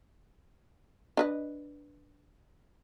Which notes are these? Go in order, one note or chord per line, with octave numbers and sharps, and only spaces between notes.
D4 B4 D#5